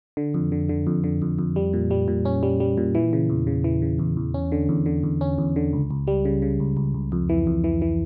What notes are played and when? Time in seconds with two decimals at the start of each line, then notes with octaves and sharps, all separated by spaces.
0.17 D3
0.34 F2
0.52 D3
0.69 D3
0.87 F2
1.04 D3
1.22 F2
1.39 F2
1.56 G3
1.73 A#2
1.91 G3
2.08 A#2
2.25 C#4
2.43 G3
2.60 G3
2.78 A#2
2.95 E3
3.13 C#3
3.30 E2
3.47 C#3
3.64 E3
3.82 C#3
3.99 E2
4.17 E2
4.34 C#4
4.52 D3
4.69 E2
4.86 D3
5.04 E2
5.21 C#4
5.38 E2
5.56 D3
5.73 C#2
5.91 C#2
6.07 G3
6.25 C#3
6.42 C#3
6.60 C#2
6.77 C#2
6.94 C#2
7.12 F2
7.29 E3
7.47 F2
7.64 E3
7.82 E3